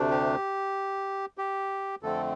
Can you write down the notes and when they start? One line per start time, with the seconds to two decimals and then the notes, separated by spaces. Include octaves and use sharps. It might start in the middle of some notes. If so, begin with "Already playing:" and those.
Already playing: D2 C3 A3 D4
0.11 G4
1.38 G4
2.03 F2 D3 A3 C4 A4